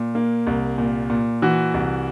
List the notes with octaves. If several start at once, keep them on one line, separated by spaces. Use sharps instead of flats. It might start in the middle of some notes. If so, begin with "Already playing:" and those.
Already playing: A#2
A#3
C2
A#2
A#2
E3 F#4
C2